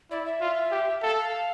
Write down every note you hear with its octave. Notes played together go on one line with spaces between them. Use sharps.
E4 D5
E5
F4
G4
A4 F5
F5